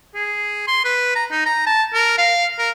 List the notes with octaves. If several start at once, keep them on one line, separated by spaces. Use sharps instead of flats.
G#4
C6
B4
A#5
D#4
A#5
A5
A#4
F5
A#4